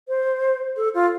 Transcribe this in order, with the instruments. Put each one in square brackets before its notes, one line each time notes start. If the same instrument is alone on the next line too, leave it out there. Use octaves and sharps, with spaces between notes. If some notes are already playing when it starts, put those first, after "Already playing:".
[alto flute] C5
A4
F4